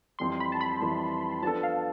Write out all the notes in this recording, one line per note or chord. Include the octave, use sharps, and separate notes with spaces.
F2 E3 G3 C6
B5
A5
B5
F2 E3 G3
F3 B3 D4 A4 A5
F5